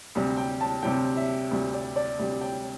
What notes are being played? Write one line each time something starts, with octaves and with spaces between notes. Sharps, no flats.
D2 C3 G3
G5
A5
D2 C3 G3 G5
E5
D2 C3 G3
D5
D5
D2 C3 G3
G5